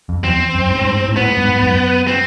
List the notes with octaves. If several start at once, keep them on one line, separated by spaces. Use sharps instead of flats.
F2
E2 C4
F#2
G#2
G2
G#2
A2
A2 B3
G#2
G2
G#2
F#2
C4